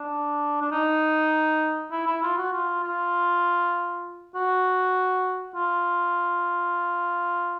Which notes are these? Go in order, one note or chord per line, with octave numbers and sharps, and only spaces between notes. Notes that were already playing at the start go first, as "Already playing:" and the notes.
Already playing: D4
D4
D#4
E4
E4
F4
F#4
F4
F4
F#4
F4